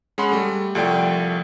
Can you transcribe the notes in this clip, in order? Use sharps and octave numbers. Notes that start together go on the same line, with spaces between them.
G#3 C#4 F#5 B5 C6
G3 A3
C2 F3 A3 D5 G5